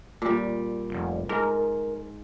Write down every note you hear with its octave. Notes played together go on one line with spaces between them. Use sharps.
A#2 G3
F1
G#2 A#4